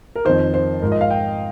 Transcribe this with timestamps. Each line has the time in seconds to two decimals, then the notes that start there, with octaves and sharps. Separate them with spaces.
0.16 A#4
0.25 F2 D#3 C5
0.54 C5
0.82 G#2 A#4
0.86 F3
0.92 D#5
1.01 F5
1.10 G5